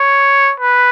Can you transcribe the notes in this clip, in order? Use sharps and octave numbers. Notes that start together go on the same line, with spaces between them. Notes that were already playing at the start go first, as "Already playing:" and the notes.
Already playing: C#5
B4